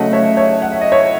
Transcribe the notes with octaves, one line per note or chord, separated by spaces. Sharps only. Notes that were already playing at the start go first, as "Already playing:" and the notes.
Already playing: C#3 F#3 A3 D#5 F#5
C#5 E5
C#5 E5
F#5
E5
D#5
C#5 E5